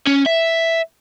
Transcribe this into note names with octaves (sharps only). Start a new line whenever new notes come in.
C#4
E5